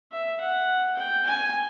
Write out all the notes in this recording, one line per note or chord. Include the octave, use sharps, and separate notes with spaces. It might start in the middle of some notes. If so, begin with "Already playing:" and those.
E5
F#5
G5
G#5